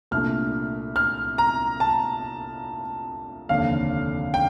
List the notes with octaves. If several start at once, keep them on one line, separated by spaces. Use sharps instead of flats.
C2 A#2 A3 D4 F6
F6
A#5
A5
F1 D#2 D3 F5
G5